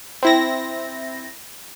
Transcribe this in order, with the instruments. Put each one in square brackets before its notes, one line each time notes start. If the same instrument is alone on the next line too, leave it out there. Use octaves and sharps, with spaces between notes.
[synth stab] C4 E4 A#6